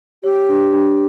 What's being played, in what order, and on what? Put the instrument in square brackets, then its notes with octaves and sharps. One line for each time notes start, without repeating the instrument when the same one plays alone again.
[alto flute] G4 [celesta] C#5
[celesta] D4
D4